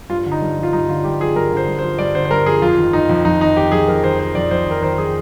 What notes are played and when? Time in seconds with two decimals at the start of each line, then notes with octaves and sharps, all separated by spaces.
0.10 G2 F4
0.26 D3
0.32 D#4
0.42 G2
0.58 F3
0.63 F4
0.73 G2 D#4
0.89 D3 F4
1.04 G2 G4
1.20 F3 G#4
1.36 G2 A#4
1.52 D3 C5
1.68 G2
1.79 C5
1.84 F3
1.98 G2 D5
2.15 D3 C5
2.25 C5
2.31 G2 A#4
2.46 F3 G#4
2.62 F2 F4
2.78 D#3
2.93 D#3 D#4
3.09 F2
3.25 F2 D#4
3.41 D#3 D#4
3.57 D#3 G4
3.72 F2 G#4
3.88 F2 A#4
4.03 D#3 C5
4.19 D#3 C5
4.35 F2 D5
4.51 F2 C5
4.66 D#3 A#4
4.82 D#3 C5
4.98 G#4